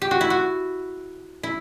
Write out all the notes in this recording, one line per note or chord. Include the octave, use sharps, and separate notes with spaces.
G4
F#4
E4
F#4
E4